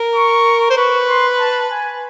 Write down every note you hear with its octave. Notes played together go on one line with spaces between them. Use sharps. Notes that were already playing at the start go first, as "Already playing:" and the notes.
Already playing: A#4
C#6
C5
B4 C#6
C6
A5
G#5